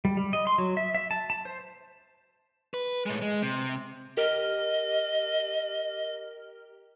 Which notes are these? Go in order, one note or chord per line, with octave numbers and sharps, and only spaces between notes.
G3
G3
D#5
C6
F#3
E5
E5
A5
A5
C5
B4
A2 G#3
G#3
C3
G4 A#4 D#5 F6